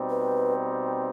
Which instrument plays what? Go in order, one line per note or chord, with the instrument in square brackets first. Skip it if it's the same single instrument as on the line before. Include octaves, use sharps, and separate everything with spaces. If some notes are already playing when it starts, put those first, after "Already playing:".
Already playing: [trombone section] B2 G3 C4 D#4
[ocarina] B4